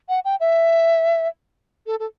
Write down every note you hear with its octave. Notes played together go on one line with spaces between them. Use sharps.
F#5
G5
E5
A4
A4